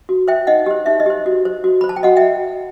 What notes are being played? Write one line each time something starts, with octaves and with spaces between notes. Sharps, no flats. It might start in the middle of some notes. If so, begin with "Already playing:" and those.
F#4
C5 E5 G5
D#4 D#5 F#5
G4 C5
D#4 E5
D#5
G4 C5
F#4
C5
F#4
B5
C5
A5
G5
F#4 D#5 F#5
E5 G5